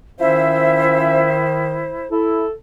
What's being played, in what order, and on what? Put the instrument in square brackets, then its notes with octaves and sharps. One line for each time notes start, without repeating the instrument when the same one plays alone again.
[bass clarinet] D#3 [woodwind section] F3 C#4 E5 [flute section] E4 C5
[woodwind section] E4 [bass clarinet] A4